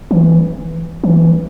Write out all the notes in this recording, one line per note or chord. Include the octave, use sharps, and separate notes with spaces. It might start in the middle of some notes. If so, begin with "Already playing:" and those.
E3
E3